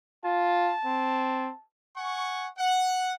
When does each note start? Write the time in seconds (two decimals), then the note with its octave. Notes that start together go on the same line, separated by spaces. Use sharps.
0.25 F4 A5
0.85 C4
1.96 F#5 G#5 C#6
2.57 F#5